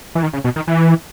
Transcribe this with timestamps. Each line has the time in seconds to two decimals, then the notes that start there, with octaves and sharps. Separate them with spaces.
0.15 E3
0.23 D#3
0.33 C#3
0.44 B2
0.56 D#3
0.67 E3